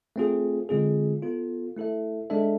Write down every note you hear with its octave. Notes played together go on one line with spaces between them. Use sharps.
A3 C4 F4 G#4
D3 G#3 C4 F4 G#4
B3 F4 A4
A3 E4 A4 E5
G#3 D4 A4 E5